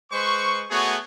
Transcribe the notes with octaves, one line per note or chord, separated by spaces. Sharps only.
G#3 B4 C5 C#6
A3 B3 F#4 G#4 C#5 C#6